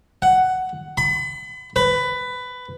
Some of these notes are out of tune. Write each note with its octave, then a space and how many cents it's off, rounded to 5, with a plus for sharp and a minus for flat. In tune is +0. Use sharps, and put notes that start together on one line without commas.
F#5 +10
B5 +35
B4 +15